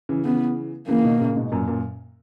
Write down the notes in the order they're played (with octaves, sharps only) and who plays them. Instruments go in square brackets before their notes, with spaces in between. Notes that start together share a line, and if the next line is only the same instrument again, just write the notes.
[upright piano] C#3 E3
[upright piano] C#3 E3 [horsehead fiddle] B3
[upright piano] C#3 E3 [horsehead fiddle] A#3
[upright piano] B2 D#3
A#2 C#3
G#2 B2
F#2 A#2
F#2 A#2